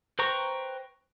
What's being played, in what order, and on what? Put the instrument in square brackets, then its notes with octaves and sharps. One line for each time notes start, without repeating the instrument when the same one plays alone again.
[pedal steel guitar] B4 C5 G5 A#5 C#6